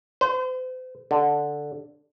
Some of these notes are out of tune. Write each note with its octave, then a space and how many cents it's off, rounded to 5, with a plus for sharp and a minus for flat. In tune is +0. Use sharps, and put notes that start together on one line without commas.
C5 -40
D3 +0